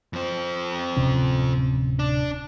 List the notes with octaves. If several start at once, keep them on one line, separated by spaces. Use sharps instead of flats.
F2 C4
D1 C3 C#4
D4